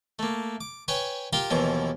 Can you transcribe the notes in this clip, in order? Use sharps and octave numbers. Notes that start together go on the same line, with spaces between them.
A3 A#3
D6
B4 C#5 G5 G#5
F4 G4 A#4 F5 G5
D#2 B2 E3 F3 A#5